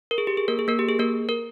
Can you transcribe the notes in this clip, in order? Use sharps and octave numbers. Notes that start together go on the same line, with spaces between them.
A#4
G#4
G4
G#4
A#3 A#4
G#4
A#3 A#4
G4
G#4
A#3 A#4
A#4